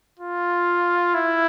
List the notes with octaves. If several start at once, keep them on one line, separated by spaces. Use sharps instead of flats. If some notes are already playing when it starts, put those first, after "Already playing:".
F4
E4